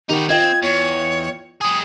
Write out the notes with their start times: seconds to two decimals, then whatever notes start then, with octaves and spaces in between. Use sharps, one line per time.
0.09 D#3 D#4 F#4 G4
0.29 C4 F4 D#5 G5 G#6
0.63 E2 C#5
1.61 G3 G#4 D#6